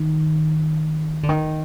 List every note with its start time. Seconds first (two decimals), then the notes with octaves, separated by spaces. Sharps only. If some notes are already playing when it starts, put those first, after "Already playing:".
Already playing: D#3
1.23 D3
1.29 D#3